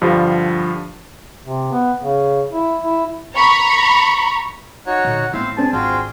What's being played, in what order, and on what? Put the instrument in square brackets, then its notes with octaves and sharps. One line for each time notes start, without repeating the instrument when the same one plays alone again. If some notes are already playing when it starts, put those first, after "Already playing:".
[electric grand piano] G2 D3 F3 G3
[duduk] C3
B3
C#3
E4
E4
[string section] A#5 B5 C#6
[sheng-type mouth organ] D#4 F#4 C#5 [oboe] F#5
[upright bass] A#2 D3
[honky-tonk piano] A2 [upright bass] B3 F4 [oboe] C4 [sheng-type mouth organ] E5 F5
[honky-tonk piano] C4 D4 G#5 [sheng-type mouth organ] G#4 [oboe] A5
[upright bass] G#1 [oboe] F4 [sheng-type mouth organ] F#4 G#4 G5